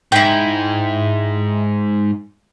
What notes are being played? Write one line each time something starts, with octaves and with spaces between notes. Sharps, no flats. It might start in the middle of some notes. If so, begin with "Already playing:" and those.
G#2 E4 G5